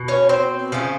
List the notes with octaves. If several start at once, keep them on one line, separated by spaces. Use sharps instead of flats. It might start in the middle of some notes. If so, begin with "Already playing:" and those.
Already playing: B2
C#4 C#5
C4 C5
C#3 F3 A3